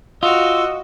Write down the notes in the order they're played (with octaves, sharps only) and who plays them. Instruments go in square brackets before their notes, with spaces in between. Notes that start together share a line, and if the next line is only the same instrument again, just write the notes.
[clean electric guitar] F4 [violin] F#4 [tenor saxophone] D#5 [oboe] E6